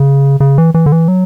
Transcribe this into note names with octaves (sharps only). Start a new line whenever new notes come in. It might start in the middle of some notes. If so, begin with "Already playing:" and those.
Already playing: C#3
C#3
E3
E3
D3
E3
F#3